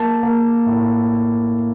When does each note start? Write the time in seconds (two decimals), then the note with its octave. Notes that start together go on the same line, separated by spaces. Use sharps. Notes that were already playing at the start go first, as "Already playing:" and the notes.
Already playing: A#3 A5
0.23 A#3
0.66 A2